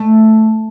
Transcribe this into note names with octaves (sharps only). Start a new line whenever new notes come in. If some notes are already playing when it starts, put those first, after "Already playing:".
Already playing: A3